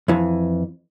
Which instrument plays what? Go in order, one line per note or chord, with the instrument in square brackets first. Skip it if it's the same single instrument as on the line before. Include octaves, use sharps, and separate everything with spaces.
[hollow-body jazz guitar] F2 E3